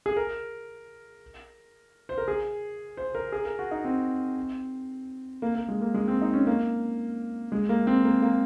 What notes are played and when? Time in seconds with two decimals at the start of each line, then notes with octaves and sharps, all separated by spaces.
0.06 G#4
0.17 A#4
2.09 C5
2.18 A#4
2.28 G#4
2.97 C5
3.15 A#4
3.32 G#4
3.45 A#4
3.59 F#4
3.71 D#4
3.85 C4
5.42 A#3
5.55 A#3
5.68 G#3
5.81 A#3
5.94 G#3
6.08 C4
6.22 D#4
6.34 C#4
6.47 A#3
7.52 G#3
7.69 A#3
7.87 C4
8.04 A#3
8.22 A#3